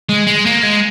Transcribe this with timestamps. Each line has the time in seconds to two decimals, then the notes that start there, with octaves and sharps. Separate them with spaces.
0.09 G#3
0.27 G#3
0.46 A#3
0.63 G#3